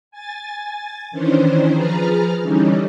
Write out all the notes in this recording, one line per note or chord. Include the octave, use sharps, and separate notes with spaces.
G#5 A6
D#3 E3 C#4 D4 C5
F3 G#4 B4 A#5 F6 A6
D3 E3 G3 C#4 D#4